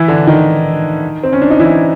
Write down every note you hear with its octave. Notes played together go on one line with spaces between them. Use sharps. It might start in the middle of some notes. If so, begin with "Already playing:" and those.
Already playing: E3 E4
D3 D4
D#3 D#4
C4
C#4
D4
D#4
E3 E4